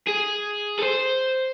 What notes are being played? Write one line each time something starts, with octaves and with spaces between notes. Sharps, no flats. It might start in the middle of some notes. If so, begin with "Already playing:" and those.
G#4
A4
C5